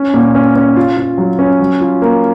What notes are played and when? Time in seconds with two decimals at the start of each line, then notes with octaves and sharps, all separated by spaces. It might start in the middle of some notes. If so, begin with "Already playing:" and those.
Already playing: C#4
0.14 A#2
0.35 C#4
0.56 C#4
0.76 F4
0.97 F4
1.18 F#3
1.39 C#4
1.60 F#3
1.81 F4
2.02 A#3